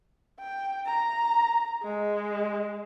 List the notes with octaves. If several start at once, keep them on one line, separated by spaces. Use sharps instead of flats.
G5
A#5
G#3